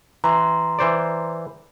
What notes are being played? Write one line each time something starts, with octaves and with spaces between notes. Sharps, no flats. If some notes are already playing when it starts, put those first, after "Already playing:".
E3 A#5 C6
E3 C5 D5